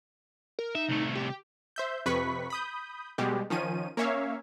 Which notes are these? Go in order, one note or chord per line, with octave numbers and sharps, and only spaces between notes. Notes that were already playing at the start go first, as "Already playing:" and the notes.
A#4
D#4 E5
C2 A3
G4
C5 E5 G6
F2 C3 B4 B5 C#6 B6
B5 D#6 G6
B2 G3 G#3 G4
D#3 F3 C#4 D#7
A#3 C#4 C#5 E5 F5